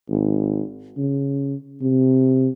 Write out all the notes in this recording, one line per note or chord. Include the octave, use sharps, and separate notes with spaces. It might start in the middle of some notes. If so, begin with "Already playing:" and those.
G#1
C#3
C3